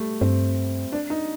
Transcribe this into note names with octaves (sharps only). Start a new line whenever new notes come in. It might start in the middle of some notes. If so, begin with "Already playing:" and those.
Already playing: G3 A3
G2 C4
D4
D#4